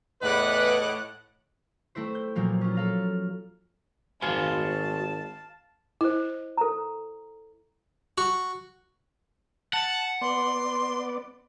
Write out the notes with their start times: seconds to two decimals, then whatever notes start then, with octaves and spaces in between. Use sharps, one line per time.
0.22 E2 A2 B4 D#5 F#5 D6 F#6
1.95 A3 C4 E4 C5
2.15 G6
2.35 A#2 F3 F#3 A#3
2.61 C#4 F4
2.75 A4 F5 A#5
4.22 G#1 F#4 C5 F5 G#5 A5
6.01 E4 C5 D#5
6.57 A4 A#5
8.18 F#4
9.73 F#5 A5
10.21 B3 D5 C6